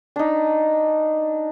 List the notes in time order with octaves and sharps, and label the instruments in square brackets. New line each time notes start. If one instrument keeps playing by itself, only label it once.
[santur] D4 D#4